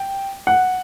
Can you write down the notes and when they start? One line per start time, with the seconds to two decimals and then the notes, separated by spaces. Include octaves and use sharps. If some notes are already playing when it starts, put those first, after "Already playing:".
Already playing: G5
0.47 F#5